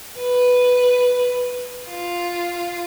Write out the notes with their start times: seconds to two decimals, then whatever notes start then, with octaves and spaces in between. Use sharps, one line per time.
0.18 B4
1.88 F4